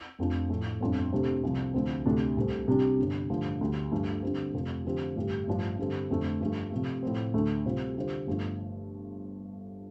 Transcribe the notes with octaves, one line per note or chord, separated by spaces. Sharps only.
F1 F2 F3 D4
A2 F3 A3
G1 F2 F3 D4
C3 A3 D4 G4 C5
C2 C3 F3
D2 D3 F3 C4
D2 C3 A3 D4
C2 C3 A3 C4
C3 G3 D4
G1 G2 D3
A1 G2 D3 F3
D2 D3 G3
G2 F3 A3 D4
D3 G3 C4
F1 F2 C3 F3
D3 F3 C4 G4
A1 G2 D3 G3
A1 G2 F3 D4 F4
G2 D3 G3 C4 A4
F1 F2 D3 A3 C4
G2 F3 A3
C3 F3 A3
A2 F3 C4
D2 D3 A3
C3 G3 F4 C5
D3 G3 F4 C5
G1 G2 F3 A3